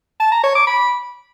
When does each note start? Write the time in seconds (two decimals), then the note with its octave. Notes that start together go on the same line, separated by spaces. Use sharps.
0.20 A5
0.32 A#5
0.44 C#5
0.55 D6
0.67 B5